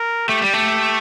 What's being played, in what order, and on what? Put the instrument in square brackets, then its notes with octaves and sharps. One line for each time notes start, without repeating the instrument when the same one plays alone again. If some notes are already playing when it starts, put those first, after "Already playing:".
Already playing: [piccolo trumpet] A#4
[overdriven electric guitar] A3 [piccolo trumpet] G4
[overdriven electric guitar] G3
A3